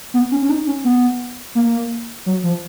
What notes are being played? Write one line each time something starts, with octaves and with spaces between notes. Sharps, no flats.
B3
C#4
C#4
D#4
C#4
B3
A#3
F#3
F3